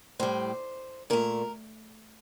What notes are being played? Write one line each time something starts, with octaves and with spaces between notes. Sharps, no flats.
A2 G3 C5
A#2 A3 A#4